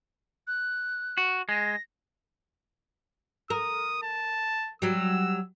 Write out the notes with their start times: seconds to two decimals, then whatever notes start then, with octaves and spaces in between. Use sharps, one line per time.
0.47 F#6
1.17 F#4
1.49 G#3 A#6
3.50 A#4 D#6
4.02 A5
4.82 F#3 G3 E6